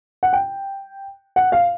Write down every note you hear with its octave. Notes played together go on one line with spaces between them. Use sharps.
F#5
G5
F#5
F5